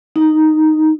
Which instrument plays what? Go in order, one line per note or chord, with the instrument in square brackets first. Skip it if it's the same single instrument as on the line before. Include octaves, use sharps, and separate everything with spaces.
[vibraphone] D#4